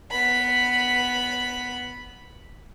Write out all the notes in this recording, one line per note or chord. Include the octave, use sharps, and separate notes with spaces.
B3 B5